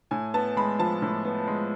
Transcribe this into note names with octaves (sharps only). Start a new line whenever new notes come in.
A2 G#5
B3 A5
G#3 B5
F3 A5
A2
B3
G#3